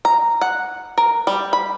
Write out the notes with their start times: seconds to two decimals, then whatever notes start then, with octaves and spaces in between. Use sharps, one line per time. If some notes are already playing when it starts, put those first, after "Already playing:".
0.05 A#5
0.41 F#5
0.98 A#4
1.27 G3
1.53 B5